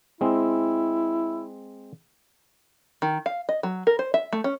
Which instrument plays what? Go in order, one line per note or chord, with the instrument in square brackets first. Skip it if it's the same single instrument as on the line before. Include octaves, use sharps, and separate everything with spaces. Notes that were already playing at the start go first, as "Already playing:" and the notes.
[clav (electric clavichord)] G#3 C4 [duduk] E4
[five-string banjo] D#3
F5
D#5
F#3
A#4
C5
E5
A3
C#4